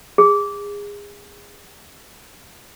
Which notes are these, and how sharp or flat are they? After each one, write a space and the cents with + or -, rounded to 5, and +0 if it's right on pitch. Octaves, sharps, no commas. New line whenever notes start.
G#4 -30